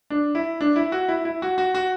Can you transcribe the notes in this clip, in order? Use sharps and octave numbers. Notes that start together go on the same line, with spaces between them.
D4
E4
D4
E4
F#4
E4
E4
F#4
F#4
F#4